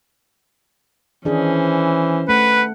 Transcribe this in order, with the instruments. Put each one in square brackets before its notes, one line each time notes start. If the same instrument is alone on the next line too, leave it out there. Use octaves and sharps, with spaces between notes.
[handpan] D#3 D4 G#4 [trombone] E3 [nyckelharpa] C#4 C5
[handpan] A3 [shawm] B4 [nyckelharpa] F#5